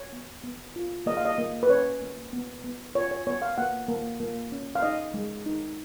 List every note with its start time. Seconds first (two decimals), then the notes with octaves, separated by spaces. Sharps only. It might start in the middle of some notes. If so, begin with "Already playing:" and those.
Already playing: C#5
0.13 B3
0.44 B3
0.76 F4
1.06 A#3 D#5
1.17 F5
1.25 D#5
1.38 A#3
1.63 B4
1.69 C#4 C#5
2.02 A#3
2.33 B3
2.64 B3
2.95 F4 C#5
3.11 C#5
3.27 B3 C#5
3.42 F5
3.58 A#3 F#5
3.88 A#3
4.20 A#3
4.52 C#4
4.75 F5
4.82 D#4 D#5
5.14 G#3
5.46 D#4